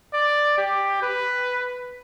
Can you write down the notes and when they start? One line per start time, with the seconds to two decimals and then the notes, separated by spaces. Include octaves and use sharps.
0.14 D5
0.58 G4
1.03 B4